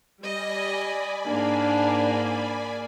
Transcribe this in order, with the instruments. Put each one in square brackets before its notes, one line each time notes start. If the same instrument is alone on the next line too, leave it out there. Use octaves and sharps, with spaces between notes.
[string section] G3 D#5 [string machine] D5 G#5 B5
[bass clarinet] G#2 [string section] A#3 G#4 [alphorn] D4